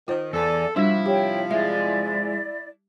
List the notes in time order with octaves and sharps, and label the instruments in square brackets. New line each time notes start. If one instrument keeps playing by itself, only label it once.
[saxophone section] D#3 [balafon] F4 C5
[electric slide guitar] E2 [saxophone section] A4 [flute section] D5 G#5
[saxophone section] C3 F3 [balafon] G3 D4 [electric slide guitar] E4 E5 [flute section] F#4
[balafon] G4 [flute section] C#5 G5
[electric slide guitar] G#3 [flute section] E4 D5 [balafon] E5